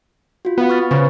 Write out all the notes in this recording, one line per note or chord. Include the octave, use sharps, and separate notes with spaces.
F4 F#4
B3 B4 F5
C#6 F6 A6
C#3 B4 C5 C#6